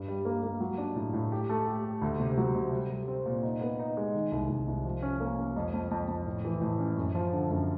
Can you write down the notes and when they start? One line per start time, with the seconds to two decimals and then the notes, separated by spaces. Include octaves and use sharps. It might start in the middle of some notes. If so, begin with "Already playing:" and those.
Already playing: G2
0.08 G3
0.25 A#3
0.43 A#3
0.60 F#3
0.78 D4
0.95 A2
1.13 A2
1.32 G4
1.49 A3
1.67 G4
1.84 G4
2.02 D2
2.20 C3
2.37 F#3
2.55 C3
2.72 G3
2.90 G3
3.08 C4
3.26 A#2
3.43 D#4
3.61 B3
3.79 D#4
3.97 G#3
4.15 D#3
4.32 C2
4.49 C2
4.67 C2
4.84 F3
5.02 C#4
5.20 A#3
5.38 C#4
5.56 F2
5.74 F2
5.91 F2
6.08 F2
6.26 A2
6.45 E3
6.61 A2
6.79 C#4
6.97 F#2
7.15 F3
7.33 D3
7.51 F#2